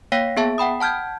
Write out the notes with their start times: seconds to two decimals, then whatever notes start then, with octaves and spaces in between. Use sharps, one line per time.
0.12 A#3 C#5 F5 G5 A#6 B6
0.37 B3 G#4 E5 A5
0.58 F#5 G5 B5 D#6
0.80 F#5 A5 F6 G6 G#6